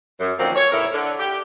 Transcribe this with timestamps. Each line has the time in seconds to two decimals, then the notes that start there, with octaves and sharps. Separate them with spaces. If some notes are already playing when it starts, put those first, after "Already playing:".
0.20 F#2
0.39 D3 D#3 F3 F#3 A#3 C4
0.56 C#5
0.71 E2 A2 E4 A4 A#4
0.93 D3
1.19 G4